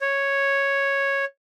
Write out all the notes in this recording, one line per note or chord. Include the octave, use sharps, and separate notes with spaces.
C#5